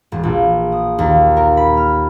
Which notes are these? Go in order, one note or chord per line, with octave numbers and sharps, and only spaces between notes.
E1
A#1
D#6
D#2
A#4
B5
F6